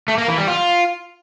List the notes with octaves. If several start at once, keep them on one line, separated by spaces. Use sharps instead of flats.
A3
A#3
E3
G3
F4